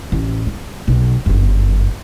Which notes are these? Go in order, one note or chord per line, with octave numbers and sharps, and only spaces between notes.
A1
G3
B1
G1 F#2